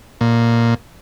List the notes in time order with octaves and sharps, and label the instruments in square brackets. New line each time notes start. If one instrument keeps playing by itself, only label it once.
[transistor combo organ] A#2